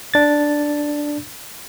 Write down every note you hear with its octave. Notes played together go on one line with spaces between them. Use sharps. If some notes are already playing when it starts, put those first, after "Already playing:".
D4 A6